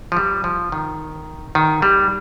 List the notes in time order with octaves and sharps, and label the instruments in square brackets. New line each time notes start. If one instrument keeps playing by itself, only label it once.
[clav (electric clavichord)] F3
G3
F3
D#3
D#3
G3